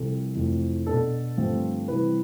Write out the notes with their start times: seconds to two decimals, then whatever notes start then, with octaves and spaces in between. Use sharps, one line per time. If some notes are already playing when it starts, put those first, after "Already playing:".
Already playing: C2 C3 F3 C4 A4
0.35 F2 C3 E3 A3 C4
0.87 B2 B3 D4 A4
1.37 G2 D3 F3 A3 C4
1.88 C3 E3 G3 C4 B4